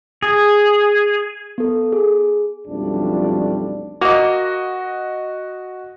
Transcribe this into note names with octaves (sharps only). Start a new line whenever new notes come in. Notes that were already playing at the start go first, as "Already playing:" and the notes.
G#4
B3 A4
G#4
B1 F2 F3 G3 A3 D4
A#3 F#4 D#5